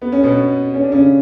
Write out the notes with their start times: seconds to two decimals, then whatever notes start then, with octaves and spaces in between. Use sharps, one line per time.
0.02 B3
0.12 C#4
0.23 B2 B3
0.74 C#4
0.83 D4
0.92 C#3 C#4